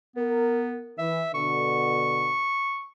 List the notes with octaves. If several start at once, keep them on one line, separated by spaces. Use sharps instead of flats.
B3 A#4
E3 E5
B2 D3 C#6